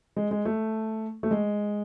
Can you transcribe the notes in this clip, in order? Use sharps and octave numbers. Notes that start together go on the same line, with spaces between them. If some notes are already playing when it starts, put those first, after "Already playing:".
G#3
G#3
A3
A3
G#3